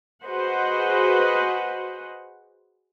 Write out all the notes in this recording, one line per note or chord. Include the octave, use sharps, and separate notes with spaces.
F#4 G#4 B4 C5 D#5 F#5